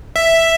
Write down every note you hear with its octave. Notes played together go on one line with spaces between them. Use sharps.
E5